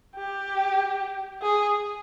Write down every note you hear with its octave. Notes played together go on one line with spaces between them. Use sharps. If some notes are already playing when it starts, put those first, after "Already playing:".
G4
G#4